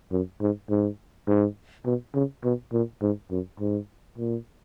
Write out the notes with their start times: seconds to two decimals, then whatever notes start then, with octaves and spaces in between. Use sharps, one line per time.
0.12 F#2
0.41 G#2
0.70 G#2
1.28 G#2
1.86 B2
2.15 C#3
2.44 B2
2.73 A#2
3.02 G#2
3.31 F#2
3.60 G#2
4.18 A#2